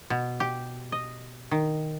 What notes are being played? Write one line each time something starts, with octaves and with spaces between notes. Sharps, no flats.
B2
G4
D#5
D#3